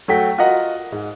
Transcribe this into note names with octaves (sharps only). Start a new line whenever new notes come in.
F#3 A3 F#4 A4 G5 B6
F4 F#4 A#4 D#5 F#5
G#2